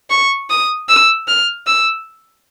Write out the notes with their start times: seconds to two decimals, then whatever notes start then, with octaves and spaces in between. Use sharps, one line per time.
0.10 C#6
0.50 D#6
0.89 E6
1.28 F6
1.67 E6